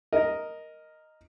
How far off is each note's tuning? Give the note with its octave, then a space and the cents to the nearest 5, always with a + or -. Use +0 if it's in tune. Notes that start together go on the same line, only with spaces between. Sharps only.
A#4 +0 D#5 +0